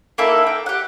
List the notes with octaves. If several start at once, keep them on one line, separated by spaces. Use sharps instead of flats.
A#3 D#4 E4 A4
G5
G4 F#5